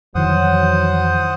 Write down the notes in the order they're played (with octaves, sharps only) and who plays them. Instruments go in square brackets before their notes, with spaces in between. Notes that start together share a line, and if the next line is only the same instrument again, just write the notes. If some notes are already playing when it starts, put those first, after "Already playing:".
[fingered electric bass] F2 D#3 E3 [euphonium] F#3 [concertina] C5 F#5 D#6